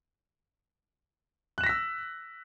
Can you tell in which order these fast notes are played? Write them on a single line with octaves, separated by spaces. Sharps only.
F#6 E7 A#6 B6 E6